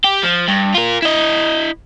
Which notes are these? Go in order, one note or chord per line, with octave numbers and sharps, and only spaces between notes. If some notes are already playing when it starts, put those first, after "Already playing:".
G4
F3
G2
F4 A#4
E4 D#5